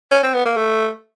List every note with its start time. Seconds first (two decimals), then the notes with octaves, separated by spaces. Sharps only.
0.11 C#4
0.23 C4
0.34 B3
0.46 A#3
0.56 A3